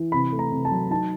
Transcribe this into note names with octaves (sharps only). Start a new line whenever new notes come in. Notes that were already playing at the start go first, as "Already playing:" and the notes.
Already playing: E3
C3 B5
A3
A#5
C3
A5
F#3
D#4 A5